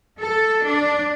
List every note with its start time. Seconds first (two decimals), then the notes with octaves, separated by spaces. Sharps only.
0.21 A4
0.65 D4